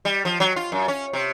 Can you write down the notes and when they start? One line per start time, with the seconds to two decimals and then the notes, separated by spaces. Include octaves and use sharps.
0.05 G3
0.25 F3
0.40 F#3
0.56 F4
0.72 F#2
0.88 C#4
1.13 C3